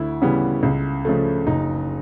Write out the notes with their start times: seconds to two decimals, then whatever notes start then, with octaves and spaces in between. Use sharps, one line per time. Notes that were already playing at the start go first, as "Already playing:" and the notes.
Already playing: D2 E4
0.22 C#3 E3 G3 B3
0.63 C#2
1.05 C#3 F3 A3
1.46 F#1 D#4